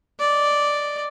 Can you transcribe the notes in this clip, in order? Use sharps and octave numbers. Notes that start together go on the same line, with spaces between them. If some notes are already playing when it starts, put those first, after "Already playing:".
D5 D#5